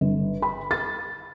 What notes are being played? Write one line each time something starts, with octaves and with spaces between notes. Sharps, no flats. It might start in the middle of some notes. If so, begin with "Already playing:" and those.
G1
B5
A6